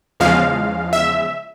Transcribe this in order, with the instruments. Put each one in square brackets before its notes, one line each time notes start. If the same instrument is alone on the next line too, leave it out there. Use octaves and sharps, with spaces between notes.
[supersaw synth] E2 C#3 F3 G#3 F5
E5